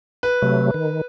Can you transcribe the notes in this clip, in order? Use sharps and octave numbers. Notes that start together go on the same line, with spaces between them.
B4
C3 F#3 A3
D#3